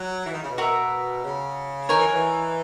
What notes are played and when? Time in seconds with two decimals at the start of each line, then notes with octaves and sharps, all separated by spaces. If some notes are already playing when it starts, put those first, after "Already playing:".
Already playing: F#3 F#5
0.26 E3
0.33 D#3
0.42 C#3
0.50 B2
0.58 F#4 A#4 E5
1.24 C#3
1.89 D#3 D#4 A#4 C#5 G#5
1.97 E3
2.05 F#3
2.13 E3